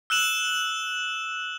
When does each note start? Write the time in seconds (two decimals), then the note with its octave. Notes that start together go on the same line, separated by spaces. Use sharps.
0.10 E6 F#6 E7 F#7